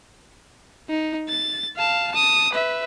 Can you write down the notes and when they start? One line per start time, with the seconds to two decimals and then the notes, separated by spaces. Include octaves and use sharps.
0.89 D#4
1.28 A6
1.77 F5 A5
2.12 A5 D#6
2.53 B4 E5